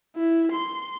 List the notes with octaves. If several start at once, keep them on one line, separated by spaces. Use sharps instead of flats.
E4
C6